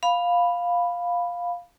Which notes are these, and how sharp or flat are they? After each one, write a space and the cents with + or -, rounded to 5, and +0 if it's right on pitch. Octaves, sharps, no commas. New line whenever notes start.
F5 +5 B5 +0